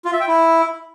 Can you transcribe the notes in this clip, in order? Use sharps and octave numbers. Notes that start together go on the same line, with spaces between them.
F4
E5
G5
E4